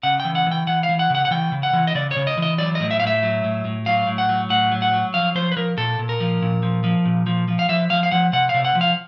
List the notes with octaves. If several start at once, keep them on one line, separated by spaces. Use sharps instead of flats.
C#3 F#5
G5
E3
F#5
E3 G5
E3 F#5
F5
E3
F#5
C#3 F#5
F#5
E3 G5
C#3
F#5
E3
D#5
C#3 D5
C#5
C#3
D#5
E3
D#5
F#3 D5
A2 D#5
E5
A2 F5
E5
F#3
A2
A2
F#3 F5
A2
F#5
F#3
A2 F#5
F#3
F#5
F#3
F3 F5
F3 C5
B4
F3 A#4
A#2 A4
A#2
A#4
F3
A#2
F3
F3
A#2
F3
F3
F5
F3 E5
F3 F5
F5
F3 F#5
C3 F#5
C3 F5
F#5
F3
F5